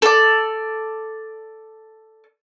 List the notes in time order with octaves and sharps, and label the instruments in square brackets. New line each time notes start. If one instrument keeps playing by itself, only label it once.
[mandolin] A4 D5